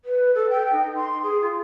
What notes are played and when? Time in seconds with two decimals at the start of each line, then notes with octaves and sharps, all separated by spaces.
0.04 B4
0.34 A4
0.49 G5
0.72 D#4
0.95 C6
1.22 G#4
1.41 F4